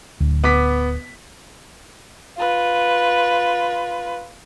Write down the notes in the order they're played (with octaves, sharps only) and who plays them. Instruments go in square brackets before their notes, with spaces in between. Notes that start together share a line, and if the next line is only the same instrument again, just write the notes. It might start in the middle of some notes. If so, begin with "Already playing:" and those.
[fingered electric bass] D1 D2
[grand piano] B3 D6 B6
[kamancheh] F4 B4